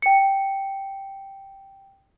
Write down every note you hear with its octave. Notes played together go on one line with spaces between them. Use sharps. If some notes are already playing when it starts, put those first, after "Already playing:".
G5 C#7